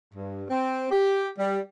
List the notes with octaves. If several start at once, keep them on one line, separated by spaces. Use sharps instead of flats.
G2
C4
G4
G3